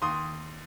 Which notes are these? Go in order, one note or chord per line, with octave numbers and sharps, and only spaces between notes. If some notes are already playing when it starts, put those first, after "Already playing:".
D#2 C6 D#6